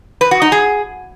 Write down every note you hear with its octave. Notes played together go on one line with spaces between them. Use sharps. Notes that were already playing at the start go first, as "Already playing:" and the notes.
B4
F#4
D#4
G#4